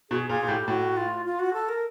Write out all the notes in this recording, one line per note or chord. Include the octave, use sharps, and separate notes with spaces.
B2 G#4
A#2 G#4
A#2
A2 G4
A2 F#4
F4
F4
F#4
A4
A#4